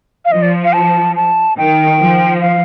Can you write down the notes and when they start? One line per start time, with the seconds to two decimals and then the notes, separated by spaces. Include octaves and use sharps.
0.25 F5
0.32 F3 D#5
0.42 D5
0.64 F5
0.74 A5
1.16 A5
1.58 D#3 G5
2.00 F3
2.41 F5